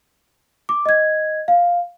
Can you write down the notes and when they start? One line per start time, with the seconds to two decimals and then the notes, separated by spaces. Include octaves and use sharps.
0.69 D6
0.86 D#5 G#6
1.48 F5